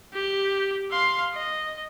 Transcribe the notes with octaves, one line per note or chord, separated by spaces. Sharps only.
G4
F5 C6
D#5